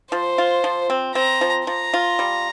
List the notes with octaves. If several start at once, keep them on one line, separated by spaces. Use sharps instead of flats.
F3 C5
F4
F3
C4
C4 A#5
F3
F3 A#5
F4
G3